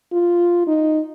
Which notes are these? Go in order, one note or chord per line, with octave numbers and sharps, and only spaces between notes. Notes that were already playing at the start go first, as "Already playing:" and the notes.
F4
D#4